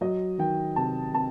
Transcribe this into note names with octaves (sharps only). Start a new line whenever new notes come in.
F#3 D#5
D#3 G5
C3 A5
C3 A5